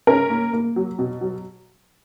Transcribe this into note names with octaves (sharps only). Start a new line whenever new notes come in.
C#4 A#4
A#3
A#3
F#3
B2
F#3